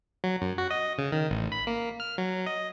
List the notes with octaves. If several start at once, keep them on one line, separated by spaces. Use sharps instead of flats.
F#3
F#2
F#4
D#5
C#3
D#3
A1
B5
A#3
F6
F#3
D#5